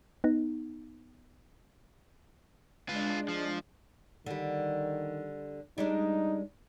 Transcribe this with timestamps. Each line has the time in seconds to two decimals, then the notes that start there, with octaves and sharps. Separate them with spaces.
0.24 B3 D#4
2.89 G#3 D4 F4 B4
3.28 F3
4.26 D3 D#3 G3
5.78 G3 G#3 D4 D#4